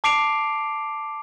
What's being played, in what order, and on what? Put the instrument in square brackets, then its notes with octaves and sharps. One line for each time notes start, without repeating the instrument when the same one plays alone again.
[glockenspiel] A5 D6 C7 D7 F7